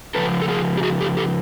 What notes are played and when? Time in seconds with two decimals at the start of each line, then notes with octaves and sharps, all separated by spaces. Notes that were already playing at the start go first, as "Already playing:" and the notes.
0.15 C#3 F3 A4 B4
0.42 A4
0.49 G#4 A#4
0.77 G4
0.83 F#4 G#4
1.01 G4 A4
1.17 G4 A4